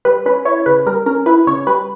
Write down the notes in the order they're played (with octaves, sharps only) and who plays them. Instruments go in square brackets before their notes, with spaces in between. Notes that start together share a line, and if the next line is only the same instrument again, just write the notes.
[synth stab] G3 B4
C#4 B4
E4 C#5
C#3 B4
G3 A#4
C#4 A#4
E4 B4
C#3 C#5
G3 B4